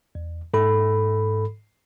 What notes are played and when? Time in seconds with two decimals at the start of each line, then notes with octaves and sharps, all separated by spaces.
0.15 E2
0.54 G#2 A4 B5